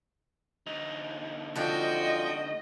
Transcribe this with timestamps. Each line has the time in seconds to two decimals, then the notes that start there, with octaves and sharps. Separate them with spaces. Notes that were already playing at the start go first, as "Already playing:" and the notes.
0.67 D2 D#4
1.56 D3 F3 C4 F#4 D#5 G5